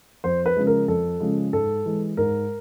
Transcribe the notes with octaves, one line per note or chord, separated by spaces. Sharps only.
F2 C5
B4
C#3 F3 G#3
A#4
F2 A4
C#3 F3 G#3
G#2 A4
E3 G#3
G#2 A#4